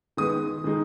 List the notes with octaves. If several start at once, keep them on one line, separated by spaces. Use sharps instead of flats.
D#3 G#3 B3 D#6
D#3 G#3 D#4